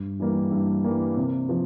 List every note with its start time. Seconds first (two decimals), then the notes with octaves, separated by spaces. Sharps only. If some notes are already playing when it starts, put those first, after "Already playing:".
Already playing: G2
0.20 E3 G3 A#3
0.52 G2
0.84 E3 G3 A#3
1.17 C3
1.49 F3